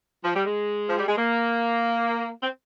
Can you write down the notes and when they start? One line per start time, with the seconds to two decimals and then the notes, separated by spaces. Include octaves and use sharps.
0.25 F3
0.35 G3
0.46 G#3
0.89 F3
0.98 G3
1.08 G#3
1.18 A#3
2.43 C4